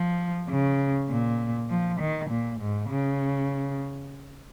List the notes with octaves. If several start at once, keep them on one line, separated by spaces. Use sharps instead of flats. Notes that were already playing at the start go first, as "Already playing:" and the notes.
Already playing: F3
C#3
A#2
F3
D#3
A#2
G#2
C#3